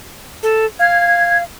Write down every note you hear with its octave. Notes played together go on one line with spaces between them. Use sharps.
A4
F5 G#6